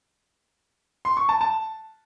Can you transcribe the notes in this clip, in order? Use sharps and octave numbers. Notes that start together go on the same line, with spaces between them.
C6
C#6
A5
A5